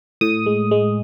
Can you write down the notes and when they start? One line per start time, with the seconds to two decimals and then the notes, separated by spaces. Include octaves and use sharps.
0.21 A2 D#6
0.46 G#3
0.71 G#3